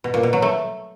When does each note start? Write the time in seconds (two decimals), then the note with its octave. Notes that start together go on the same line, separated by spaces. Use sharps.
0.04 B2
0.14 A#2
0.23 B2
0.33 F#3
0.42 A3